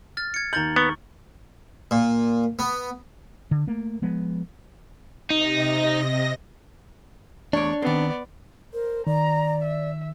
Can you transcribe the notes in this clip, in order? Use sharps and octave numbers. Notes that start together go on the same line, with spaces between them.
F6 A6
G#6 C#7
D#2 A#5 G6 A6 F#7
B3 C#6
A#2
B3
D3
A3 A#3
F3 G#3 B3
C3 D#4 D#5 A#6
E2 A3 D4 C#5 D5
D#3 B3 C4 D5
A#4 C5
D#3 D5 A#5
E5